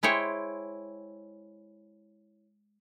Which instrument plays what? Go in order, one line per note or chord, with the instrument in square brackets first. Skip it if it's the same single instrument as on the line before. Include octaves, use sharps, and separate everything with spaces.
[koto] G#3 E4 C5 C#5 G5